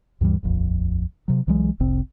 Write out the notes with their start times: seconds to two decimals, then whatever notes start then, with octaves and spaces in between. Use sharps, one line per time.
0.21 D2 G2 E3 G3
0.43 D#1 A#1 F2
1.28 C3 F#3
1.47 C2 E3 F#3 G#3
1.80 F1 C2 C3 C4